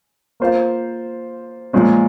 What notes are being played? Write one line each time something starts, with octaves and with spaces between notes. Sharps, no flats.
A#3 F4 C5 F5
A#2 F3 G#3 C#4